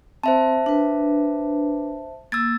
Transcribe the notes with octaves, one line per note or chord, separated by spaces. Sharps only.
C4 C5 E5 A5
D4 B4
A#3 E6 G#6 A6